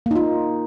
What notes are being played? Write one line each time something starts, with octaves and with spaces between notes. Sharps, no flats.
A#3 D#4 F4